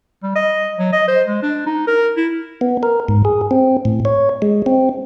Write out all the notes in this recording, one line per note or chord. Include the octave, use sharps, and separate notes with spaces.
G3
D#5
F#3
D#5
C5
G#3
D4
D#4
A#4
E4
B3
A#4
G#2
G#4
C4
A2
C#5
G#3
C4